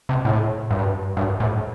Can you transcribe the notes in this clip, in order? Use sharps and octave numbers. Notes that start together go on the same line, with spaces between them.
C3
A2
G2
G2
A2